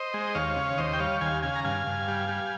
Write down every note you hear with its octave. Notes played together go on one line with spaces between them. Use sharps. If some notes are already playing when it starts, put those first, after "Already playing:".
Already playing: C5 D#5
G#3
D#2 C#5 F5
C#3
D#2 C5 D#5
G5
G3 C#5 F5
D#2 F5 G#5
C#3 F5 G#5
A#5
G2 F5 G#5
G2
G3
G3